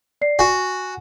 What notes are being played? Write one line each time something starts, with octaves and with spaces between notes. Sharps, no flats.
D5 C7
F#4 G#5